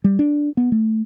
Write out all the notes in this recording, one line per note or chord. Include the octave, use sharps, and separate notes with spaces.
G3
D4
B3
A3